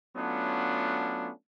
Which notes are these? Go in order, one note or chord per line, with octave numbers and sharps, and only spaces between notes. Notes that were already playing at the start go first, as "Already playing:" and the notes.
F#3 A3 B3 C#4 D4 F4